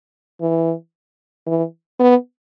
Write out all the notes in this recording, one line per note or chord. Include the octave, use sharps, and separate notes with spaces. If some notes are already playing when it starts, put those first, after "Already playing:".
E3
E3
B3